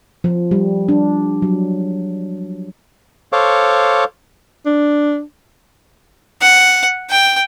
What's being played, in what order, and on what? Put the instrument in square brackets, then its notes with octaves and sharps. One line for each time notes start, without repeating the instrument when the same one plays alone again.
[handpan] F3
G3
D4
F#3
[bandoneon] A4 C5 C#5 F5 C#6 D6
[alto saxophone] D4
[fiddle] F#5
G5